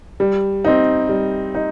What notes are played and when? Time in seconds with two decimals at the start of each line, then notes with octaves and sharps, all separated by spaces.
0.20 G3
0.65 C4 D#4
1.09 G3
1.55 D#4